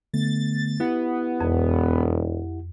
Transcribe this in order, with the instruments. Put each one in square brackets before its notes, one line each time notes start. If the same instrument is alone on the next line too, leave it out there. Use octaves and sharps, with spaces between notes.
[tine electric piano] D3 A3 B3 [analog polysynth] A6
[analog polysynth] B3 [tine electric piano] E4 G4 F#5
[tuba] E1 [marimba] F2